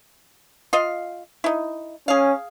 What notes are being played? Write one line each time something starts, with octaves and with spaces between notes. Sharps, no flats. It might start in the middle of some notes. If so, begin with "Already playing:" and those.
F4 D#5 F5
D#4 E4
C#4 G#4 F5